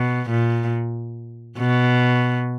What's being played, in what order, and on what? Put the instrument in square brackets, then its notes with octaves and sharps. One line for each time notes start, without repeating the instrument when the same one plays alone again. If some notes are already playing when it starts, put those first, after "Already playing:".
Already playing: [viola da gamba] B2
A#2
B2